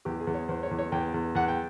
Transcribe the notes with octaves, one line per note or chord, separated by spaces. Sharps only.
E2 G4
G#4
E2
C#5
E2 C5
C#5
E2
C#5
E2 G5
E2
E2 F#5
G5